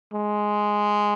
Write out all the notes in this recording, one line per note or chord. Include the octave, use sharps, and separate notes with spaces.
G#3